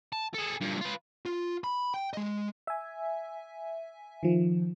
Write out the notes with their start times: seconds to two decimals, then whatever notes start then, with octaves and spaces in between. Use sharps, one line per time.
0.12 A5
0.34 G#4 A4
0.61 G2 A#2
0.81 F4 B4
1.26 F4
1.64 B5
1.94 G5
2.13 G#3 D#5
2.67 E5 G#5
4.23 D#3 F3